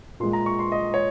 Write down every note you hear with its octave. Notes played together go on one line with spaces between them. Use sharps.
A#2 G#3 C6
A#5
C#6
C6
D#5
C#5